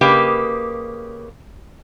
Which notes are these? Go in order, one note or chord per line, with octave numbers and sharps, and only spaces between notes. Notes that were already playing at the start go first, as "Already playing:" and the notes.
C#3 A#3 G4 B4 D#5